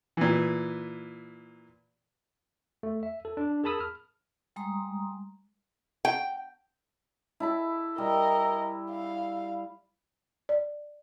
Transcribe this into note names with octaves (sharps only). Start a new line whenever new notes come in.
A#2 E3
A3
E5
A4
D4
G#4 A#4 A5 B5 D#6 E6
F6
G3 G#3 A#5 C6 D#6
G5
E4 A5 B5
G3 A#4 D#5
F5
D5